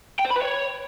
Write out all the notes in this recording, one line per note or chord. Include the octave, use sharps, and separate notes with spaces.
G5
C5
B5
B4
C#5